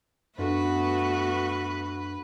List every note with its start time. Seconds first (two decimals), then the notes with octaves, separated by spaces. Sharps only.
0.39 F#2 A3 B3 D4 F#4 A4 B4